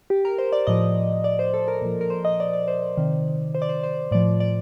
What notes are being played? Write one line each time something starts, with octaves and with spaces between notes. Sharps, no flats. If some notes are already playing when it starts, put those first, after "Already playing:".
G4
A#4
C5
D5
A2 F3 D#5
D5
C5
A4
A#4
A#2 F3
A#4
C5
D#5
D5
D5
C5
C3 D#3
C5
D5
C5
C5
A2 F3 D5
D5